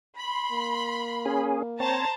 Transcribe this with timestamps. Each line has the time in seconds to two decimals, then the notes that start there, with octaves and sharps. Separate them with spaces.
0.17 B5 C6
0.52 A#3
1.26 C#4 G#4
1.80 C4 C5 C#5 A5 A#5